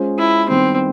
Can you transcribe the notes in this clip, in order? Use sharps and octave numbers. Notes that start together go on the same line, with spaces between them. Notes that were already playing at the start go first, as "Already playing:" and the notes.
Already playing: G#3 C#4 F4 G#4 C5
E4
D#3 G3 B3 C4